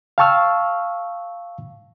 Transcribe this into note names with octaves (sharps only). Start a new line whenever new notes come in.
F5 G5 A5 C#6 E6 F6